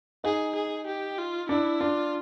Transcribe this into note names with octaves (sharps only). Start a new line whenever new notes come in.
D#4 G#4
G#4
G4
F4
D4 E4
D4 F4